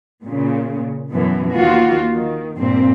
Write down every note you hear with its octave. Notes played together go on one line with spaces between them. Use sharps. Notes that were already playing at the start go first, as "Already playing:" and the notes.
A#2 C#3
F#2 B2 E3
D#2 A#3 F4 F#4
D#3
G2 A#2 C4